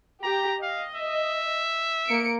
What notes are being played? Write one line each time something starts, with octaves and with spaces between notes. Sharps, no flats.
G4 A#5
D#5 F5
E5
A#3 C#7 D7